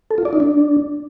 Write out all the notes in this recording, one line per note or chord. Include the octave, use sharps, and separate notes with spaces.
A4
F4
D5
D#4
D4